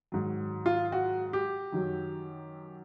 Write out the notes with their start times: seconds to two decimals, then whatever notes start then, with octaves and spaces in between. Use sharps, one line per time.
0.12 G#2 D#3 F#3
0.66 F4
0.92 F#4
1.33 G4
1.72 F#2 D#3 F#3